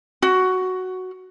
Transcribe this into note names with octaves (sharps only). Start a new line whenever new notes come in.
F#4